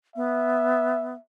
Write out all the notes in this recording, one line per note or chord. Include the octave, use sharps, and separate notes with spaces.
B3 E5